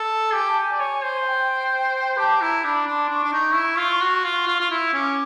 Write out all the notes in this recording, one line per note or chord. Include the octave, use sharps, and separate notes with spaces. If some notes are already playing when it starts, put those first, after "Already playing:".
Already playing: A4
G4 G#5
A5
G#5
D5
C#5
C5
F#5
G5
G4 A5
E4 A#5
D4 B5
D4 C6
D4 C#6
D4
D#4
E4
F4
F#4
F4
F4
F4
E4
C#4 D6